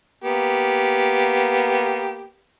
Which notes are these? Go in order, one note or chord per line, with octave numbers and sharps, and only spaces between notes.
A#3 B3 G4